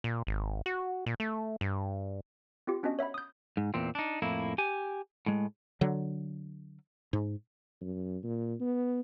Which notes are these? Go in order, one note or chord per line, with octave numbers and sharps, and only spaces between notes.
A#2
G#1
F#4
A#2
A3
G2
C4 F4 G4
B3 C#4 D4 F#4 D#5
C#5 E5 F#5 B5
D#6 G6
G#2
E2 A#2 C4
D4 D#4
F2 A2 A#3 E4
G4 G#5
A2 G#3
D3 F#3
G#2
F#2
A#2
B3